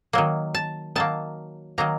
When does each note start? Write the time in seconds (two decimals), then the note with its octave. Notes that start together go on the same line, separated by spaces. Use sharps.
0.13 D#3 F#3 A#3
0.55 A5
0.95 D#3 F#3 A#3 A5
1.78 D#3 F#3 A#3 A#5